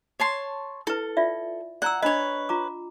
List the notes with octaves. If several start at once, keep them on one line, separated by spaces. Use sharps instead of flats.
C#5 A5 C6
E4 A4 B4
F4 D5 E5
D5 F#5 A#5 E6
D4 B4 C#5 D#5
F4 A#5 D6